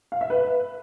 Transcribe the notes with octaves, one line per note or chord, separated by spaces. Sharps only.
F5
E5
B4